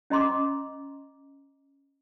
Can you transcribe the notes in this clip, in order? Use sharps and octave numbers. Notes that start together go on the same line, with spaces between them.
C#4 D#5 A#5 C6 D6